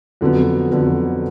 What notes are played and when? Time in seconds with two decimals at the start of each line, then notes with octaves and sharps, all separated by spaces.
0.21 F2 D3 F#3 B3
0.71 F2 D3 F#3 B3